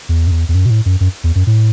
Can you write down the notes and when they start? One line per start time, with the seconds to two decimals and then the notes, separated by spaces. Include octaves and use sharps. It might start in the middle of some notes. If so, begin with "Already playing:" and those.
0.09 E2
0.27 F#2
0.31 E2
0.49 E2
0.55 F#2
0.66 B2
0.70 A2
0.86 F#2
1.00 F#2
1.24 E2
1.35 F#2
1.47 A2